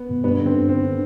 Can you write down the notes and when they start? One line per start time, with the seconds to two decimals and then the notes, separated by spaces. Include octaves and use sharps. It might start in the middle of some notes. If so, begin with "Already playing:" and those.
Already playing: B3
0.09 B2
0.24 G2 B3
0.39 D3
0.46 C4
0.54 G2
0.69 D3 C4
0.84 D3